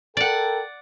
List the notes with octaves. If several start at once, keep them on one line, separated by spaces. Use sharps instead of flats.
A4 A#4 D5 F#5 G5